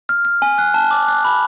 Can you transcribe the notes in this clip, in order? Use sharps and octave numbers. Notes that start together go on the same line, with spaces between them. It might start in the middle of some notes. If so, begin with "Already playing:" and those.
F6
F6
G#5
F#6
A5
D6
F#6
B5